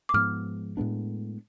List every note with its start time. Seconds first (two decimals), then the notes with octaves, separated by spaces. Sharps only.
0.09 D6
0.14 G#2 F3 B3 F6
0.77 A2 G#3 B3 D4